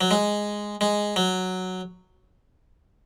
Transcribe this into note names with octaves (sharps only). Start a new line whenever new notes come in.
F#3
G#3
G#3
F#3